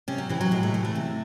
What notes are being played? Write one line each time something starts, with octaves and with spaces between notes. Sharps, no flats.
C3 C#4
F#3
C3 E3
F#3
A2 G#3
A3
E3
A3
C3